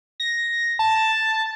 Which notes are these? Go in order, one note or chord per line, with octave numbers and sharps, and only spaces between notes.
A#6
A5